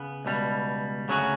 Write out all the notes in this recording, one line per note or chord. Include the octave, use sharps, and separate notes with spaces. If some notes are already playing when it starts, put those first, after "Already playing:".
Already playing: C#3 B3
C#2 B2 G3
D2 C#3 F#3 C#4 F#4